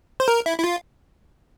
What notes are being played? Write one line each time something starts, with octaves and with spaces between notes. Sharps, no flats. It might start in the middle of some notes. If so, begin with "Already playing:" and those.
C5
A#4
E4
E4
F4